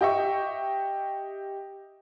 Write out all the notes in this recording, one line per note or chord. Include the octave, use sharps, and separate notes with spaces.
G4 D#5 E5 C#6